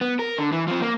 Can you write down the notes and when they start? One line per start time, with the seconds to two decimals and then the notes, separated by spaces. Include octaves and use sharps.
0.01 B3
0.19 A#4
0.38 D3
0.52 E3
0.68 F3 C4
0.82 A#3